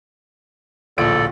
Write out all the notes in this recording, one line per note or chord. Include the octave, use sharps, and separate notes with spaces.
D1 A#1 A4 D5 D7